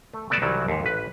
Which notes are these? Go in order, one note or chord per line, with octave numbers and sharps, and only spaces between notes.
A3
A3 B3 D5 D#5 A5
C2 D#3 E3 F#3
D#2 G#2
A1 B4